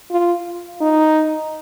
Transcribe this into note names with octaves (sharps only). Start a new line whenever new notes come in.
F4
D#4